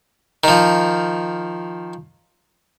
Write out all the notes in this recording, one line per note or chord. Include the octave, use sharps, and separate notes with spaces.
D#3 F3